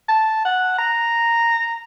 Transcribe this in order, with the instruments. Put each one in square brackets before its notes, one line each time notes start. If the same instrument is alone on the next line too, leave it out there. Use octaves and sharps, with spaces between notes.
[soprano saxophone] A5
F#5
A#5